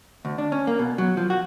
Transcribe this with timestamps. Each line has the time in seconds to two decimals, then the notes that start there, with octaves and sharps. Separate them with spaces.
0.25 D2
0.38 D4
0.52 C#4
0.67 A#3
0.79 B2
0.98 F#3
1.17 F3
1.30 F#4